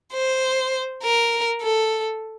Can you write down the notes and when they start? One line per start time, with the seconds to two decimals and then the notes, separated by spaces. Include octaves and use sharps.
0.13 C5
1.03 A#4
1.62 A4